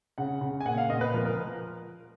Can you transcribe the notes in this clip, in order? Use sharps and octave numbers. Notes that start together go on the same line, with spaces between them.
C#3 F#5
C#3
G#5
A#2 F#5
F5
A#2 D#5
B4
F3 A#4
A#4